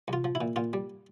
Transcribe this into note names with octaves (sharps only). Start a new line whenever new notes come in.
C2 F4
F3
E4
A#2
A#2 F4
G3